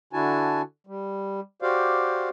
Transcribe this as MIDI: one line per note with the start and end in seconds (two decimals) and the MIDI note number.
0.13 0.62 50
0.13 0.62 62
0.13 0.62 64
0.13 0.62 66
0.13 0.62 80
0.13 0.62 81
0.87 1.40 55
1.62 2.29 66
1.62 2.29 67
1.62 2.29 72
1.62 2.29 74
1.62 2.29 77